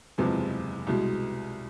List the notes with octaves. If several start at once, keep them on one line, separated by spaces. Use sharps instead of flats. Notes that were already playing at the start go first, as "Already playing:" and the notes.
F#1 E2 C3 F3 G#3
C2 B2 G#3